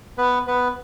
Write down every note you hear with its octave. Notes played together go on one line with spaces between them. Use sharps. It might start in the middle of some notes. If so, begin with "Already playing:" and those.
B3 B4
B3 B4